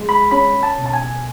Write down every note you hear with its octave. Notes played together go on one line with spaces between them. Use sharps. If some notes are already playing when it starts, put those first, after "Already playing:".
Already playing: G#3
B5
C#4 B5
A5
B2
A5
G#5